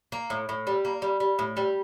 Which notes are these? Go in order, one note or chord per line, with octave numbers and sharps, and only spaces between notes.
A#3
A2
A2
G3
A#3
G3
G3
A2
G3